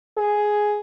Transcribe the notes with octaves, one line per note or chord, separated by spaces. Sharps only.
G#4